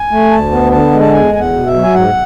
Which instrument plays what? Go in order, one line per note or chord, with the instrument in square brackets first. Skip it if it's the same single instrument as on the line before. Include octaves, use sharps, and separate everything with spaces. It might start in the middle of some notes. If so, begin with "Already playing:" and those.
Already playing: [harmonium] G#5
A3
D2 A5
B3
D3 A5
G#3
A5
E2 G#5
E2 G#5
F#5
B2
E5
F#3
G#5
G#2 F#5